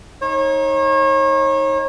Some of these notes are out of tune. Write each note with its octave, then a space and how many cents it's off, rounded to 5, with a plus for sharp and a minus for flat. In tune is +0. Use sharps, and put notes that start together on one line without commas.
D#4 +15 C#5 -35